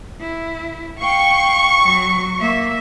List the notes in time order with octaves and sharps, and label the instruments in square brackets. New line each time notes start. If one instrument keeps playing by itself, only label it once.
[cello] E4
[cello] F5 G5 [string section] C#6
[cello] F#3
A#3 E5